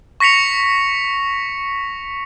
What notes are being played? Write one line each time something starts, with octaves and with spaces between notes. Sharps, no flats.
C#6 A#6 B6 C#7 F7